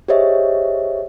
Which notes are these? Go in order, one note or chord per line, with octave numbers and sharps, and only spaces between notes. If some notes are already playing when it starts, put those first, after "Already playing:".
G4 G#4 C5 C#5 D#5 E5